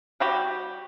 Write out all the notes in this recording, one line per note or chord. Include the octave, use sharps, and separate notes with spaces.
G3 F#4 G4